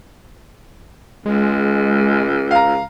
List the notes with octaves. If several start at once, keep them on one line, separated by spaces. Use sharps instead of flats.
C#2 G#3
F5 A#5